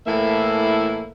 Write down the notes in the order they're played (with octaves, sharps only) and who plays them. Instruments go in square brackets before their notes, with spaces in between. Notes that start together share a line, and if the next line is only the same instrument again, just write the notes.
[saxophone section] A2 E3 A#3 E4 A4 E5